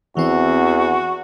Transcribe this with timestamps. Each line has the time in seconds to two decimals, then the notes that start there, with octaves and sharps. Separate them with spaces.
0.17 E2 E3 C4 F#4 E5